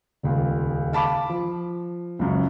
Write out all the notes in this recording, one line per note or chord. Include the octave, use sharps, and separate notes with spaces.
D#1 C#2
F5 A5 B5 D6
F3
C#2 F#2